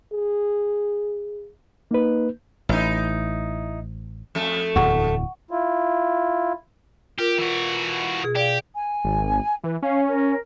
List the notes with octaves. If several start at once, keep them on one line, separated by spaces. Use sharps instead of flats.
G#4
A#3 D#4 B4
A1 D#4 E4
F2 A3
D1 E2 F#5 C#6
E4 F4
F4 G4 A#4
E3 F#4
B2 G#4
G4 D5 F5
G#5
G#1
E3 B4
C#4 F5
A#4